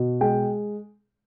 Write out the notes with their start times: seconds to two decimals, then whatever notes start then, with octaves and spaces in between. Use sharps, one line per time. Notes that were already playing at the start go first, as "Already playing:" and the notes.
Already playing: B2
0.21 G#3 G5